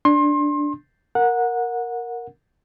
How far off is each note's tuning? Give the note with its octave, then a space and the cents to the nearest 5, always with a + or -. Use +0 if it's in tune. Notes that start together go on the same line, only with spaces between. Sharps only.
D4 +0 C6 +30
A#4 +0 F#5 -20